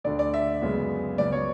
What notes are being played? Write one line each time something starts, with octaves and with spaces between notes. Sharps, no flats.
D2 D3 A3 D5
D5
E5
F#2 C#3 G#3 B3
C#2 C#3 F#3 B3 D5
C#5